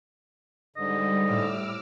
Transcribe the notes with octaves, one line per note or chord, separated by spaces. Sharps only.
G#2 D3 G3 D#5
A2 D6 E6 F6